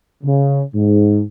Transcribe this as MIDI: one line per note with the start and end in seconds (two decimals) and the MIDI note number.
0.24 0.60 49
0.75 1.22 44